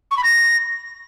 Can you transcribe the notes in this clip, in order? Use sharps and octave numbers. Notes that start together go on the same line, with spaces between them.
C#6
B5
A#6